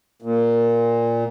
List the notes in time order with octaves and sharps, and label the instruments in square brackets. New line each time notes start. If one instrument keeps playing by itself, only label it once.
[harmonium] A#2